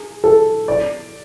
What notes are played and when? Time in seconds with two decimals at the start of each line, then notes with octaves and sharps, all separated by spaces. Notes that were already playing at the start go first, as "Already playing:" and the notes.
Already playing: G#4
0.24 A4
0.68 D5